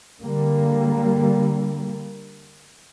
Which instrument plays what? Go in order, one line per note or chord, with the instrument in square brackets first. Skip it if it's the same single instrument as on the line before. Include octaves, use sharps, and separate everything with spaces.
[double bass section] D3 G3 A#3